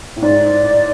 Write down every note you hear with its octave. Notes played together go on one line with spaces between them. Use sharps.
A2
G#2 D5
A2